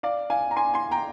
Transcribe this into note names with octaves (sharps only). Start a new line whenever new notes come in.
D5 F5
F5 G#5
A#5
G#5 C6
G#5 C6
G5 A#5